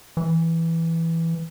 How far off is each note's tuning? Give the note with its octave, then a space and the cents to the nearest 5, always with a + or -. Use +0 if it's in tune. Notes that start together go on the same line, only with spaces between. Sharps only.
E3 +0